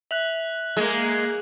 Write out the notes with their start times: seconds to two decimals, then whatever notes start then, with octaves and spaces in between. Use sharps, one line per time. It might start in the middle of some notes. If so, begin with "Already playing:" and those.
0.11 E5 F#6 F7 F#7
0.77 G#3 A#3